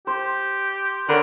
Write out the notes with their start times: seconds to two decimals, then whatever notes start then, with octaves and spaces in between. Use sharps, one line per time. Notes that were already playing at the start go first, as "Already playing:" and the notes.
0.07 G4 C5
1.09 D3 A#4 B4 C#5